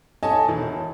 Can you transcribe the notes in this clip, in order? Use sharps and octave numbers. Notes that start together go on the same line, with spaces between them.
A4 C#5 D#5 G#5 A5
E1 E3